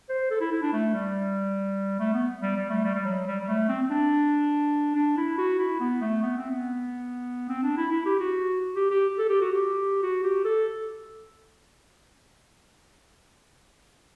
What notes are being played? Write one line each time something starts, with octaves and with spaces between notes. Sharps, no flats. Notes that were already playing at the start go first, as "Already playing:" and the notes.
C5
A4
E4
E4
D4
A3
G3
A3
B3
G3
G3
A3
G3
G3
F#3
G3
G3
A3
C4
C4
D4
D4
E4
F#4
E4
B3
A3
B3
C4
B3
C4
D4
E4
E4
G4
F#4
G4
G4
A4
G4
F#4
G4
F#4
G4
A4